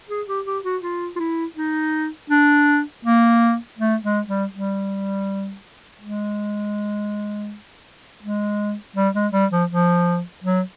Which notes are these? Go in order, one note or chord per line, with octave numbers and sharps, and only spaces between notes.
G#4
G4
G4
F#4
F4
F4
E4
D#4
D4
A#3
A3
G#3
G3
G3
G#3
G#3
G3
G#3
G3
F3
F3
F#3